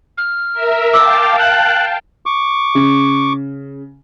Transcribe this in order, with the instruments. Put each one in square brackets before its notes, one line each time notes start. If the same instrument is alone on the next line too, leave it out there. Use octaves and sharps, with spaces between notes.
[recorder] F6
[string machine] A#4 E5
[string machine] F5 G5 A5 [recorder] D6 [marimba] E6
[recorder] F#6
[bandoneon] C#6 D6
[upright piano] C#3